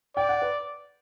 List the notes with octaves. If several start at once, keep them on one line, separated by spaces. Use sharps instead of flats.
D5 G5
F#5
B4